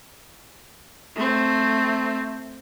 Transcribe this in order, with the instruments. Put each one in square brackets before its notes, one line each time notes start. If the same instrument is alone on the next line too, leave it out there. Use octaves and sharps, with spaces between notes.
[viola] A3 C4